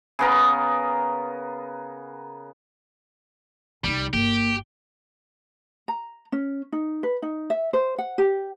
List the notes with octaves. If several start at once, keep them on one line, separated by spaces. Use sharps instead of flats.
C#3 B3 A#4
C2 G3 D#4
G1 A#3 G4
A#5
C#4
D#4
B4
D#4
E5
C5
F#5
G4